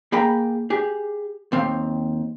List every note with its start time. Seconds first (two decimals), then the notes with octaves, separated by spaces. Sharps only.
0.12 A#3 G#4 G5 A#5 B5
0.70 G4 G#4
1.52 D#2 C4 F5